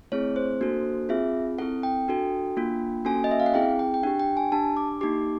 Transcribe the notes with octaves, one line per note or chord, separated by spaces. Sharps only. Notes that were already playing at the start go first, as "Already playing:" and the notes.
A3 C4 E4 G#4 C#5
C5
A#3 D4 F#4 A4
C4 F4 G#4 E5
C4 E4 A4 F#5
G5
D4 F#4 A4
A#3 D4 F4
A#3 C#4 F#4 A4 G#5
D#5
E5
F5
F#5
C4 E4 G#4 G5
G5
G5
D4 G4 F#5
G5
G#5
D4 G4 A5
D6
A#3 D#4 G4 D6